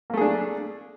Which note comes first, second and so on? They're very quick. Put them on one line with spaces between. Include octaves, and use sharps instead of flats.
A#3 A3 G#4 D4